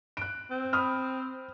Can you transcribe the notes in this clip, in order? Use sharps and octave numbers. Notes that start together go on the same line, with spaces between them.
F#6 D7
C4
B5 D#6 F6